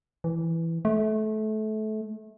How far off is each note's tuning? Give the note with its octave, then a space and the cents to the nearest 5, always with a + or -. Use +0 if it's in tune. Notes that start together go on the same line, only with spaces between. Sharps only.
E3 +5
A3 -25